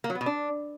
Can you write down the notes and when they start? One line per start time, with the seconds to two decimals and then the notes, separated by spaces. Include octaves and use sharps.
0.04 A#3
0.10 F#3
0.15 B3
0.21 B2
0.26 D4